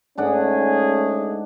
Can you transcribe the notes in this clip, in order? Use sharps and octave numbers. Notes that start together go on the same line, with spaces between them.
G#2 A3 C#4 D4 G#4 F#5